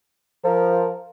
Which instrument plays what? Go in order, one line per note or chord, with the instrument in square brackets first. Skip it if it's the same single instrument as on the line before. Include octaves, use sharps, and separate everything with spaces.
[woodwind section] F3 [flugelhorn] A#4